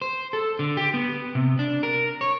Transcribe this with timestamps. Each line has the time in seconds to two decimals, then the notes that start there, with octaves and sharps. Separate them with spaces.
0.02 C5
0.33 A4
0.59 D3
0.77 G4
0.94 B3
1.35 C3
1.59 D4
1.83 A#4
2.21 C#5